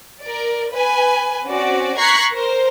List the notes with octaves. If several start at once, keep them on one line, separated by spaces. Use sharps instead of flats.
A#4 D5
B4 G#5
C4 C#4 F#4 D5
A#5 C#6 F#6 G#6 B6 C7
A#4 C5